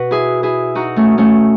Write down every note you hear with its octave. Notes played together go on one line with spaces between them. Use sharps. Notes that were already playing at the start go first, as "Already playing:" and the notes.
Already playing: B2 F#4 B4
E4 G#4
E4 G#4
D#4 F#4
A3 C#4
A3 C#4